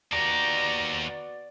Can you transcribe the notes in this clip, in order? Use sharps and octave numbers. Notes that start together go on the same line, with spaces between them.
D#2 B3 F#4 G4 D5 A#5